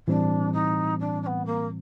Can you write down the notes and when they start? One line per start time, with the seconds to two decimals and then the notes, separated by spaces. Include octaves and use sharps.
0.07 A2 E3 G3 C4 D4
0.53 D#4
1.00 D4
1.22 D4
1.27 B3
1.46 A#3